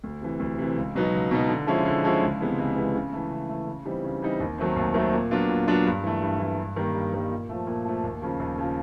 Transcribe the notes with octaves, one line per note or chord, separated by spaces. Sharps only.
D2
C3 E3
D2
C3 E3
C#2
B2 F#3 B3 D#4
C#2
B2 F#3 B3 D#4
D3
F3 G#3 C#4 E4
D3
F3 G#3 C#4 E4
C#2
C3 E3 G#3 B3
C#2
C3 E3 G#3 B3
C#3
E3 A3
C#3
E3 A3
C#3
E3 G3 C4 D#4
C#3
E3 G3 C4 D#4
D#2
D#3 F#3 A3 C4
D#2
D#3 F#3 A3 C4
A#2
F#3 B3 D4 F4
A#2
F#3 B3 D4 F4
G2
E3 A3
G2
E3 A3
G2
D#3 G3 A#3
G2
D#3 G3 A#3
A#2
F3 A3
A#2
F3 A3
D#2
C#3 F3
D#2
C#3 F3